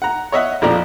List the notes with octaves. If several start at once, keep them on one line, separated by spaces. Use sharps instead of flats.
F#5 A#5
C#5 D#5 E5 F#5
A#1 F2 F3 D5 A#5